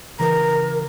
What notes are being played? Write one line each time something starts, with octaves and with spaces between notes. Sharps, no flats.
C#3 E3 A#4 A#5